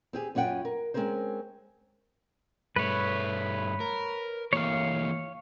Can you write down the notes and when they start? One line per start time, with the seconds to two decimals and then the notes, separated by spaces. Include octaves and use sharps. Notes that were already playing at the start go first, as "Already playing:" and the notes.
0.13 C4 G4 G#4
0.35 F#2 C#4 F4 F#5 G5
0.65 A#4
0.94 G#3 C4 C#4 G#4 A#4 C5
2.76 G2 A3 B4 C#5
3.80 A#4
4.53 E3 A3 A#3 C#5 F5